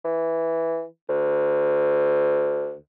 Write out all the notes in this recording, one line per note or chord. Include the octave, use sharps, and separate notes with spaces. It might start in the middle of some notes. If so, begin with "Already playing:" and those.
E3
D2